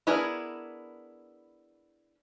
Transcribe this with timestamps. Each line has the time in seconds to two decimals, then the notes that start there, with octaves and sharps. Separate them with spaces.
0.07 B3 D4 E4 G#4 A#4